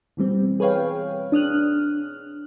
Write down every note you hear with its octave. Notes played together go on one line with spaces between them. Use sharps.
B2 E3 G3 C4
G#4 B4 C#5 F5 G5
D4 D#6 F6 F#6